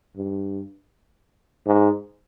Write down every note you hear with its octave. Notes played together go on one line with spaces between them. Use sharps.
G2
G#2